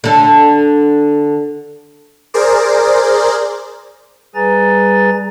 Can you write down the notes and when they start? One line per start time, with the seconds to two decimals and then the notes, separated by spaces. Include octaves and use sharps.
0.04 D3 A4
2.34 G#4 A#4 C5 D5
4.35 G3 G#4 B4 G#5 A#5 A6